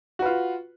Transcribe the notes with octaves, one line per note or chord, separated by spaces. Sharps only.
F4 F#4 B4